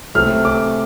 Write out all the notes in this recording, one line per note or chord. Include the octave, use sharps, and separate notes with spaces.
C3 A3 C4 F6
D6